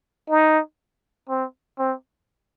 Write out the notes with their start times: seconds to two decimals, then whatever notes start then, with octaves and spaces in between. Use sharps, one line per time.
0.30 D#4
1.29 C4
1.78 C4